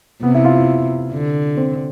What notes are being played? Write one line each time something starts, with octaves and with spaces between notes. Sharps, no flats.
C3 B3
E4
F4
E4
D3
C4